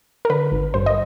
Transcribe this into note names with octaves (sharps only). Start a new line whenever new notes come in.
A#4
D3 B4
G#1
G2 C5
D#5